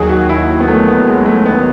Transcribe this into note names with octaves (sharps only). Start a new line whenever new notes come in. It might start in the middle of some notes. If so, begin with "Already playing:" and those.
Already playing: D#2 D#3 F#3 G#4
F#4
E4
B3
A3
B3
G#3
A3
B3